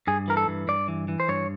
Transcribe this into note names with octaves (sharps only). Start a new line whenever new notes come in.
G2 G#4
E3 A#4
A4
G2
G2 D5
E3
E3
C5
G2 C#5